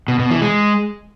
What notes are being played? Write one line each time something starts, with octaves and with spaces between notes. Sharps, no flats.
B2
B2
E3
G#3